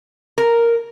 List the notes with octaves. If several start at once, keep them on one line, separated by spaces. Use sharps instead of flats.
A#4